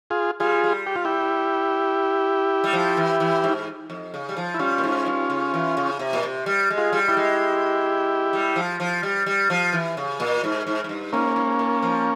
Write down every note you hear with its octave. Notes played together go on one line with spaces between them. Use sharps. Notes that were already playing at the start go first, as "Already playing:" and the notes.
F4 G#4
G3 F4 G#4
G3
G4
F4
E4 G4
G3
F3
E3
E3
G#2
F2
C#3
G3
F3
E4
G3 C#4 F4
A#2
G#2
G2
C#3
E3
C#3
C3
A#2
C3
G3
G#3
F4 G#4
G3
E4 G4
G#3
G3
F3
F3
G3
G3
F3
E3
C#3
A#2
G#2
G#2
G#2
G2
G#2 A#3 C#4
G#2
A#2
F3